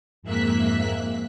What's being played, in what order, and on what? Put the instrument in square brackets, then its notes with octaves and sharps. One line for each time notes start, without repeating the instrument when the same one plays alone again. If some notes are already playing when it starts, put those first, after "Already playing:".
[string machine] F2 G#2 A#3 E5 F#6 B6